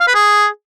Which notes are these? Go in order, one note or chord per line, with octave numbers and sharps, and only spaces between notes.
F5
B4
G#4